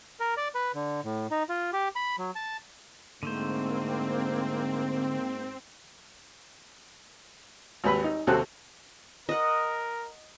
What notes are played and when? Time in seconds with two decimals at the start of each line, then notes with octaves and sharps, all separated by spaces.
0.20 A#4
0.37 D5
0.55 B4
0.74 D3
1.04 A2
1.31 D#4
1.49 F4
1.73 G4
1.96 B5
2.19 F#3
2.35 A5
3.23 G#2 D3 A3 A#3 C4 C5
7.84 G#1 D#2 B4 B5
8.04 D#4
8.27 D#2 C3 C4 F#4 A4 F#6
9.29 A#4 D#5 F#5